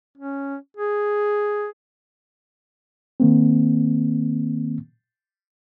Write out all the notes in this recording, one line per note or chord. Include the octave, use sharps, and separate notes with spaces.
C#4
G#4
D#3 A#3 C4